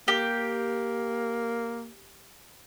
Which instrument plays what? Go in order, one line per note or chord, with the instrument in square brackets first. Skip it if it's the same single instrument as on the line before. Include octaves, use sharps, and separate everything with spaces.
[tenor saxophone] A#3 [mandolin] G4